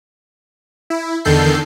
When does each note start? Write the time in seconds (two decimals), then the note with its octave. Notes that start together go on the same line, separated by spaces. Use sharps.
0.90 E4
1.25 E2 D3 D#3 A4 G6 C7